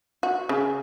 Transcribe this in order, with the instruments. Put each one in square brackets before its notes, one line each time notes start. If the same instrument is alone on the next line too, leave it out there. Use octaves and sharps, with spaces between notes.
[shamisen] F#4
C#3